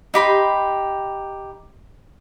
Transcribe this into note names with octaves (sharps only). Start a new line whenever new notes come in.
D#4 G4 B5 C6